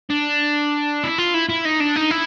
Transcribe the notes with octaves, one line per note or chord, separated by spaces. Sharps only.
D4
E4
F4
E4
E4
D#4
D4
D#4
E4